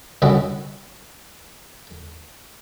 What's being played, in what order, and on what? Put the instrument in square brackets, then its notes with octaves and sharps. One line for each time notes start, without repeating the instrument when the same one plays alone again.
[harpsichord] C2 D3 C#4 E4 F#4 D#5